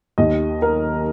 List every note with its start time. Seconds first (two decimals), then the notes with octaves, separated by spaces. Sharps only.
0.18 D#2 D#3 D#5
0.62 A#4